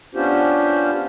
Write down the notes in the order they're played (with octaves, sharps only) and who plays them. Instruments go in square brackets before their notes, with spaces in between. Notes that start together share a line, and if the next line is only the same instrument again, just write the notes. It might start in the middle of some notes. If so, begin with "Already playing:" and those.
[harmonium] B3 C#4 D4 F4 G4 C5